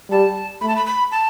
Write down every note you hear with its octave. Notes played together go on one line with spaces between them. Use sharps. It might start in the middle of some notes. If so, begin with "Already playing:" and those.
G3 A5
A3 B5
A5
B5
B5
A5